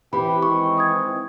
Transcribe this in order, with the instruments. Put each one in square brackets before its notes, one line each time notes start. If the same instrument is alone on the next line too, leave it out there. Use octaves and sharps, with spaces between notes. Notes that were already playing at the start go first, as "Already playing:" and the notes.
[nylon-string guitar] E3 [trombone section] C4 E4 G4 [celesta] B5
[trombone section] D#3 G#3 C4 [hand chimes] C#6
[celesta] D#6 G#6